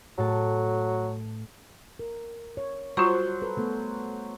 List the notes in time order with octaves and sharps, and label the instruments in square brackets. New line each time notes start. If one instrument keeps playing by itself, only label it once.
[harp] A2 A4 [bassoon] F#3
[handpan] A#4
C#5
[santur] F#3 C5 [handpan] G3 [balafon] F4 C#6
[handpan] A4 B4
A3 B3 A4